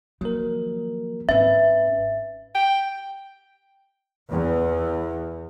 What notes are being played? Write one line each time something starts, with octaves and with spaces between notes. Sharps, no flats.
D#3 F3 F#3 A#3 A#4
G#1 C4 C#4 B4 E5
G5
E2